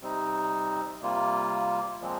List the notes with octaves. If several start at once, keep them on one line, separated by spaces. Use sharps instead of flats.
C3 G3 C4 D#4
C3 G3 A#3 F4
A#2 F3 G#3 C4